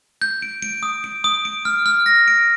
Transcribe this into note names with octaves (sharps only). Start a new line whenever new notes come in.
G6
D7
D7
D#6
D7
D#6
D7
F6
F6
A#6
D7